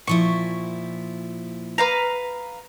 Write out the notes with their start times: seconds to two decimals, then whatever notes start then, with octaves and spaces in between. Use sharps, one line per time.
0.07 A#2 F3 E4 C#6
1.78 B4 F5 A#5